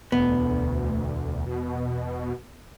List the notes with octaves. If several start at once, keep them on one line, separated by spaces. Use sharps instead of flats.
E1 D2 B3
B2